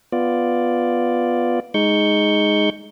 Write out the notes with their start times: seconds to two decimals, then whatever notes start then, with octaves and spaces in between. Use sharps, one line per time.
0.12 B3 F4 D5
1.74 G#3 D#4 C#6 G6